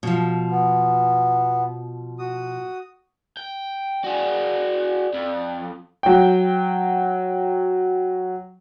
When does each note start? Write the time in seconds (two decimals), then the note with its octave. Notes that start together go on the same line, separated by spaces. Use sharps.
0.03 B2 F3
0.51 B3
2.19 F#4 D#6
3.37 G5
4.04 F#4 G#4 D5
5.14 F2
6.03 F#3 G5